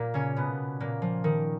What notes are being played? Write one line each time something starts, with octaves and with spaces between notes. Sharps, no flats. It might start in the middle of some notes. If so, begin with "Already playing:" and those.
Already playing: A#2 A#3
C#3 C#4
B2 B3
A#2 A#3
F3
D#3